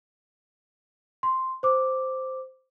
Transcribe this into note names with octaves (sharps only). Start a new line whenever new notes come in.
C6
C5 D6